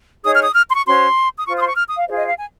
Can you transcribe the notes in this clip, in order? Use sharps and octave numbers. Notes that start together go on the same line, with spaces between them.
D#4 G#4 C#5 D#6
F6
D#6
F6
C6
C#6
C#4 F#4 C5 C6
D#6
F4 C5 C#6
D#6
C6
C#6
F6
D#6
F5
F4 G#4 C5 D#5
D#5
F5
G#5